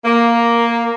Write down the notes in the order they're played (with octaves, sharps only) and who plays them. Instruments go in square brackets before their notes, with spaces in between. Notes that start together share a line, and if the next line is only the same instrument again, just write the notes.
[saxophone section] A#3